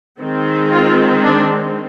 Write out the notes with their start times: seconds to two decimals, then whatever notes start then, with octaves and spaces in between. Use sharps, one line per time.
0.20 D#3 G#3 C4
0.72 F4
1.23 D4